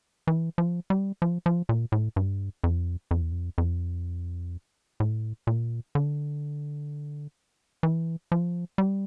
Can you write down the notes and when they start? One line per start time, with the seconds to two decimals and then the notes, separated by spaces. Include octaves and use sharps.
0.27 E3
0.58 F3
0.90 G3
1.22 F3
1.46 F3
1.69 A#2
1.92 A2
2.16 G2
2.64 F2
3.11 F2
3.22 E2
3.32 F2
3.58 F2
5.00 A2
5.47 A#2
5.95 D3
7.83 E3
8.32 F3
8.78 G3